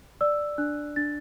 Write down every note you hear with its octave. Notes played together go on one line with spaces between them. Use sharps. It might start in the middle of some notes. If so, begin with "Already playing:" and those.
D5 E6
D4 F#6
D4 A6